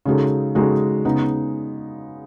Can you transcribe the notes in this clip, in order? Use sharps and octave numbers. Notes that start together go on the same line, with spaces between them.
C#3 G#3 D#4 F#4 A4
C#3 G#3 D#4 F#4 A4
C#3 G#3 B3 D#4